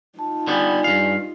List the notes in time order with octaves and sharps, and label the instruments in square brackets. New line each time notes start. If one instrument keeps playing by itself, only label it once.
[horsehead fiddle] D#4 F4 [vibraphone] A5
[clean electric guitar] D3 G3 B3 [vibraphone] D5 G#5
[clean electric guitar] G2 F5